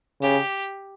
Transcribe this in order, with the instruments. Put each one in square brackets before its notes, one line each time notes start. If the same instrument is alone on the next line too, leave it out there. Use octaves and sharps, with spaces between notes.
[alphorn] C#3 [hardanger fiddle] G4